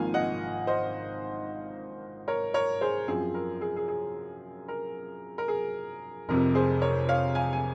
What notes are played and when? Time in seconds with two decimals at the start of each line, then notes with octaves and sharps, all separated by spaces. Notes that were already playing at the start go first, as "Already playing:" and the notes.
Already playing: G#1 G#2 F3 A#3 F5 G#5
0.14 D#5 F#5
0.67 C5 D#5
2.28 A#4 C#5
2.54 A#4 C#5
2.81 G#4 C5
3.08 F#2 F3 C4 G#4
3.34 A#4
3.61 G#4
3.76 G#4
3.88 G#4
4.68 A#4
5.38 A#4
5.48 G#4
6.28 F1 F2 C3 A#4
6.55 G#4 C5
6.81 A#4 C#5
7.09 C#5 F5
7.35 F5 G#5
7.53 G#5